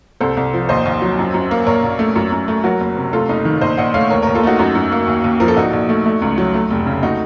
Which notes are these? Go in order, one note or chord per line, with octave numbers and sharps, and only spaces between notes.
C2 A4 C5
C2
F3
D#2 C5 D#5
D#2
F#3
F#2
F#2
A#3
A#1 A#4 C#5
A#1
A3
F#2
F#2
A3
F#3 F#4 A#4
F#1
C3
A3 F4 A4
F#1 D#4
D#3
A#1 C5 D#5
A#1 D#5 F#5
A3 C#5 F5
D#2 A#4 C#5
D#2 A#4 C#5
F4 A4
A3 D#4 F#4
F#2 D#4 F#4
F#2
A#3
D#2
D#2
F3 A#4
A4
A#1 D#4 F#4
A#1
A3
A3
C#2
F#3
A3
F1
C#3
A3 D#4 F#4